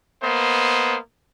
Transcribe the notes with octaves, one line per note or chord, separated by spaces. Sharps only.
A#3 B3 C5 D#5